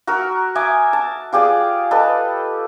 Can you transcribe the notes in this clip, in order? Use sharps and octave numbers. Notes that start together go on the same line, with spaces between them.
F#4 A#4 E6
E5 G#5 D6 D#6
A5
F4 G4 G#4 D5
G4 A4 B4 D#5